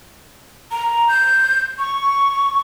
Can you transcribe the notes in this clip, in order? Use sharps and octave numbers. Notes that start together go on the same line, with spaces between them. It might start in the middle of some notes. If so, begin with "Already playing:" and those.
A#5
G6
C#6